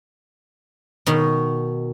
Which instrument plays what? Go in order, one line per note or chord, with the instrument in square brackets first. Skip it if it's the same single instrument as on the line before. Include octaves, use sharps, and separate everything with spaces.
[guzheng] B2 D#3